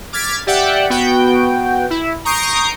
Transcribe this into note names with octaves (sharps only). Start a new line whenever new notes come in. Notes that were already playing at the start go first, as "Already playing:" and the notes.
D6 F6 G#6 A6 B6
G4 D5 E5 F#5 G5
B3 F#4 G5
E4
A#5 C#6 D#6 G6 C7 D7